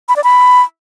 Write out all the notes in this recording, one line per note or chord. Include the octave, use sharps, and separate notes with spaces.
B5
D5
B5